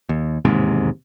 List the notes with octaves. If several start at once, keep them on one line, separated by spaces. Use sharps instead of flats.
D#2
E1 D#2 G#2 C3